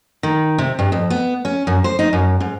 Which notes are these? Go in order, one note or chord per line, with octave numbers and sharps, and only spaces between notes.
D#3
C3
G2
F2
B3
C#4
F#2
C5
D#4
F#2
G#2